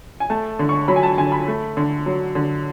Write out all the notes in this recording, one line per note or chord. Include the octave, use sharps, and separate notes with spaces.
G#5
A3 A5
D3
C#6
F#3 B5
G#5
A5
D3 G#5
B5
A3
D3
F#3
D3